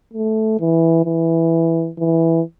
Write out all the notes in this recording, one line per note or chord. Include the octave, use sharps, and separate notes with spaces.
A3
E3
E3
E3